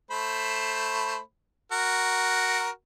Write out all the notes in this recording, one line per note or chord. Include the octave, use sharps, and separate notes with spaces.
A3 C5 B5
F#4 A#4